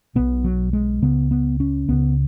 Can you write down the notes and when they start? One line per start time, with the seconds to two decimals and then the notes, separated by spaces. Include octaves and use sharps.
0.15 B1 B2 B3
0.44 F#3
0.73 G#3
1.02 C#2 C#3 B3
1.31 B3
1.60 C#4
1.89 C#2 C#3 B3